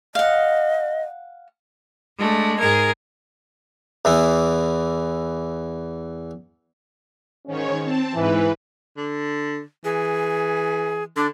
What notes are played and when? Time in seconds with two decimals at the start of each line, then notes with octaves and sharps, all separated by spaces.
0.15 D#5 F5 F#5
2.17 G#3 A3 D4
2.59 G#2 G#4 A#4 G#6
4.05 E2 E3 E4
7.47 G#2 D#3 C#4 C#5
7.84 C4 A5
8.14 G#2 E3 B4
8.97 D3
9.84 E3 G#4
11.16 D3 D4